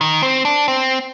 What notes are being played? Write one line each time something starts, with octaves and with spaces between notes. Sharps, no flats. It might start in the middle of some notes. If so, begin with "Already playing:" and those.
D#3
C4
D4
C4